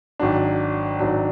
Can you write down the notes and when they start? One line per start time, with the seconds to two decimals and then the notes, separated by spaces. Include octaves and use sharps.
0.19 G#1 G#2 F#3 D4
0.99 G#1 G#2 F#3 D4